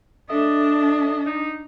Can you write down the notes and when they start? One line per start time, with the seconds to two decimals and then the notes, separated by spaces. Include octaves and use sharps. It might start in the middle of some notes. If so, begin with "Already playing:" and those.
0.30 D4 A4 D#5 E5
1.26 D#4